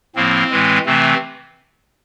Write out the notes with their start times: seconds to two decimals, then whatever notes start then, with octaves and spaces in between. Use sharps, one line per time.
0.15 A2 F3 A#3 C4
0.51 A2 E3 G#3
0.86 C3 E3 A3 C4